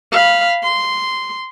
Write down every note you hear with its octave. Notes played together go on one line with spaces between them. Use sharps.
F5 B5
C6